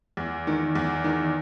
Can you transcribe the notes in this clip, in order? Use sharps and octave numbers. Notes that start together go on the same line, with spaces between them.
E2
D#3
E2
D#3